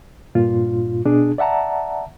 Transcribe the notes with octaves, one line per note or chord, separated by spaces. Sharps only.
G2 A#2 F4
B2 D4 G#4
D5 E5 F#5 A5 A#5